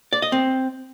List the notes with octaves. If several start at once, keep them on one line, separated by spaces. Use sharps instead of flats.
D5
D#5
C4